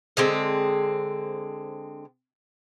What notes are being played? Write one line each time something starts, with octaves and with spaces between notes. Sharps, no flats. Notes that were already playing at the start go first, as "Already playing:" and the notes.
D3 G#3 C4